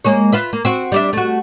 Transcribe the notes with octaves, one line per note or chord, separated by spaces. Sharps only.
G#3 A#3 C#5
F4 B4 E5
A#3
C4 F#4
G3 D4 E5
A3 F#4